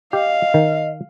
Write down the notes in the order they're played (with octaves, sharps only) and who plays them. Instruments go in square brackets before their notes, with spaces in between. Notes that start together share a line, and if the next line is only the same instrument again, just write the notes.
[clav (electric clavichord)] G4 [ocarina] D#5 [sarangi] F5
[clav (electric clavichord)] D#3